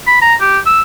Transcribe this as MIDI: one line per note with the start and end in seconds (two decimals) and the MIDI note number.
0.07 0.18 83
0.22 0.35 82
0.41 0.59 67
0.66 0.82 88